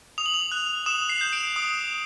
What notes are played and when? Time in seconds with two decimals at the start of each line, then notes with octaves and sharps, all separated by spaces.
0.18 D#6 F7
0.26 F#7
0.34 F7
0.52 F#6
0.86 D#6 E7
1.09 C7
1.21 G6
1.33 D7
1.56 D#6